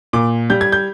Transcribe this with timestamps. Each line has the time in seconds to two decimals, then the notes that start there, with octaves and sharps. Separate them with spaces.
0.13 A#2 D6
0.50 G3 G6
0.61 G#6
0.72 G6